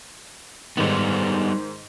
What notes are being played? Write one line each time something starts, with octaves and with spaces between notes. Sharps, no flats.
G#2 D#3 G3 B3